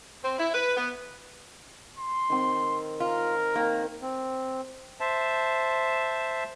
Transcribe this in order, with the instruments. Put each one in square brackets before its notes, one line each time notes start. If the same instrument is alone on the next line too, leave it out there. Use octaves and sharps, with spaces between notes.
[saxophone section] C4
E4
B4
B3
[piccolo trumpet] C6
[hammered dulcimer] D#3 C4
[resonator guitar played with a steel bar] F4 [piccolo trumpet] A#4
[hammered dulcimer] D#3 [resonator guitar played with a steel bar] A#3
[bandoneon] C4
C5 E5 A5